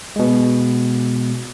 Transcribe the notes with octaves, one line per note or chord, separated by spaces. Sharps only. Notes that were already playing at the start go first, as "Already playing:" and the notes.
B2 G#3